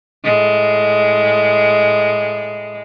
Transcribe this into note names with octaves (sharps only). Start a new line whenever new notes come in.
A2 G#3